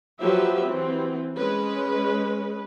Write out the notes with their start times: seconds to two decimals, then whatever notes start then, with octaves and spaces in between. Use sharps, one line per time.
0.21 F3 F#3 F4 G4 B4 E5
0.65 E3 C4
1.36 G#3 C#4 B4